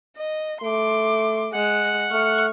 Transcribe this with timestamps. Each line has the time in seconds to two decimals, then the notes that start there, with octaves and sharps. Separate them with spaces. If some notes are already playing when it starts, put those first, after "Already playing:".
0.17 D#5
0.62 A3 C6 D6
1.53 G#3 F#5 F#6
2.11 A3 C#6 F6